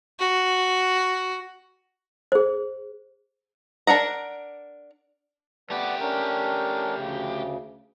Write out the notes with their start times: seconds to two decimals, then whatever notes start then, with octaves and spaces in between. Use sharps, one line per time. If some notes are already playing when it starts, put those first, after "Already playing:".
0.20 F#4
2.32 G#4 C5
3.87 D4 A#4 F#5 A#5
5.70 A3 B3 G4 B4 D5
6.00 C#4 D4 A#4
6.96 D2 C#3